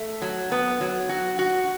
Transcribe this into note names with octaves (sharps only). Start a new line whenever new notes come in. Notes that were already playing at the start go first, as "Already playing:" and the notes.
Already playing: A3
F#3
B3
F#3
F#4
F#4